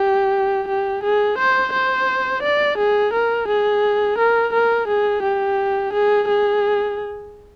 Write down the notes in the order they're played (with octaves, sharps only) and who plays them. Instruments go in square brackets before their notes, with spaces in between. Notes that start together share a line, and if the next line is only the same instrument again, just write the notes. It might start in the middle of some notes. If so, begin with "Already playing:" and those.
Already playing: [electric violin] G4
G4
G#4
C5
C5
D5
G#4
A#4
G#4
A#4
A#4
G#4
G4
G#4
G#4